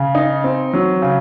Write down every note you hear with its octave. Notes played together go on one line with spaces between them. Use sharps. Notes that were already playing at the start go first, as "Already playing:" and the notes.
Already playing: C#3
D#4
C4
F#3
C#3